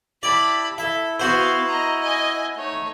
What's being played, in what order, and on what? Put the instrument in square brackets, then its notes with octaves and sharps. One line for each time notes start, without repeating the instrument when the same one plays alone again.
[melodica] E4 G4 [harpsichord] D5 [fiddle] A5 B5
[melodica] E4 [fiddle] A4 [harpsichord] E5
[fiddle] B3 F5 [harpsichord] F#4 C5
[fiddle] D#5 A#5
D#5 G#5
[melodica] A3 [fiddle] D#4 C#5